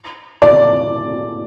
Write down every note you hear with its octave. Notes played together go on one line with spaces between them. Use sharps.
D5